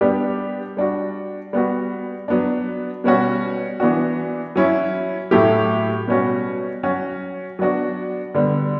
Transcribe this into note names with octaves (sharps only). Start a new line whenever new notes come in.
G3 B3 D4 G4
G3 D4 F#4
G3 B3 F#4
F#3 B3 D4
B2 G3 C#4 F#4
E3 B3 D4 F#4
F#3 C#4 E4
A2 F#3 A3 E4 G4
B2 G3 C#4 F#4
F#3 C#4 F#4
F#3 B3 D4 F#4
D3 G3 B3